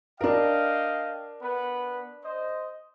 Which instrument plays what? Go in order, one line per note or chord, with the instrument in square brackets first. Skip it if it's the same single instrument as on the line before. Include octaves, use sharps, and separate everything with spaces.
[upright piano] D4 A#4 [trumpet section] D#5 F5 G5
[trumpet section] B3 B4
C5 D#5